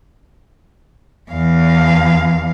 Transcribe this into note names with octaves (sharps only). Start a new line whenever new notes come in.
E2 F5